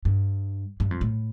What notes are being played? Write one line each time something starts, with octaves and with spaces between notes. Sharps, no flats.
G2
G2
F2
A2